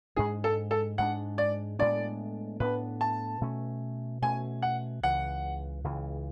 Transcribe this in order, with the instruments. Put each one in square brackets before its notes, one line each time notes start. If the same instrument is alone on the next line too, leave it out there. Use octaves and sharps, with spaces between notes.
[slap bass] G#2 G#3 D4 [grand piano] G#4
[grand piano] A4
A4
[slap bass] G#2 G#3 D4 [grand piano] F#5
[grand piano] D5
[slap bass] A2 G#3 B3 D4 [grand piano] D5
[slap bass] A2 G#3 B3 D4 [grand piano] B4
[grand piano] A5
[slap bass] B2 A3 C#4
[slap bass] B2 A3 C#4 [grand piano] G#5
[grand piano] F#5
[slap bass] C#2 C#3 E3 [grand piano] F#5
[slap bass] C#2 C#3 E3